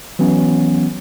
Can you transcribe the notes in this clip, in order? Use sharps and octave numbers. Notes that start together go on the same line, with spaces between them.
E3 F#3 B3 C#4